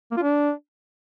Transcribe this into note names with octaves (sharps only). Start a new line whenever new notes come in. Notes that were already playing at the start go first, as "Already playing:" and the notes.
A#3
F4
D4